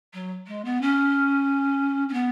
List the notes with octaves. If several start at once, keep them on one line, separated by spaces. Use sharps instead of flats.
F#3
G#3
B3
C#4
C#4
B3